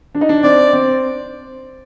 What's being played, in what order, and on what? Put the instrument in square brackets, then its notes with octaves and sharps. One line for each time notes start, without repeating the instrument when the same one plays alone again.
[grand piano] D4
D#4
D4
[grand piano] C4 [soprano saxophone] D5
[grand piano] C4